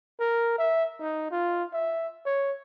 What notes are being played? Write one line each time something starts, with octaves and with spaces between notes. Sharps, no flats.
A#4
E5
D#4
F4
E5
C#5